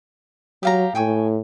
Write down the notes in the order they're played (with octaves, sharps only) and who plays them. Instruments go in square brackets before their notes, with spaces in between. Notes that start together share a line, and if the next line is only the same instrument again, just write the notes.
[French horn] F#3 [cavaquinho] G4 F5 A#5
[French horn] A2 [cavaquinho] G5 G#5 C#6